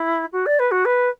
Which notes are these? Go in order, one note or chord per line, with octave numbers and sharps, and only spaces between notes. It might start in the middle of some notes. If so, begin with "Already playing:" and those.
Already playing: E4
F#4
D5
B4
F#4
B4